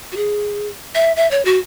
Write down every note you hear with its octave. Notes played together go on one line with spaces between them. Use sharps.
F#4
G#4
E5
E5
C#5
F#4